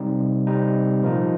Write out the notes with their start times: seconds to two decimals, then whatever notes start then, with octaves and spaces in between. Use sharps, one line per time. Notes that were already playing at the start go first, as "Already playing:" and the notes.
Already playing: C3 G3 C4 D#4
0.47 C3 G3 C4 D#4
1.02 A#2 F3 A#3 D#4